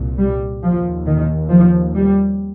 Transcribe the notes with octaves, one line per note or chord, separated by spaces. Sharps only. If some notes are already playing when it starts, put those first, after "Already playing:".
Already playing: C2 A#2
G3
D#2 F3
D#3
F3
G3